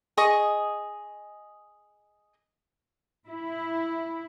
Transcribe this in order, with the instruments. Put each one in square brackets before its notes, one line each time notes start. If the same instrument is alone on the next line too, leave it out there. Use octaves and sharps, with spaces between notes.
[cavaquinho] G#4 D#5 C#6 D#6
[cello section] E4